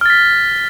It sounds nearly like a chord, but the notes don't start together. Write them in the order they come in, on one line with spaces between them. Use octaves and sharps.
F6 A6 B6